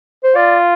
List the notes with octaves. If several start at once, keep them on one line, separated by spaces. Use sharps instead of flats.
C5
F4 D5